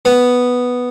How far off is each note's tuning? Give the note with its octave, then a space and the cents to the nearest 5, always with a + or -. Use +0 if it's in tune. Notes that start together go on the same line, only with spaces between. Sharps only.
B3 +0